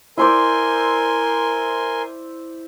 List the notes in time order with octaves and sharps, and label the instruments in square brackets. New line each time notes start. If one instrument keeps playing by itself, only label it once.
[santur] E4 C5 D5 [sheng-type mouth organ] A#4 G#5 C6